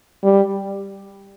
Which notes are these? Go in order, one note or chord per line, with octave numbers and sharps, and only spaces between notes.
G3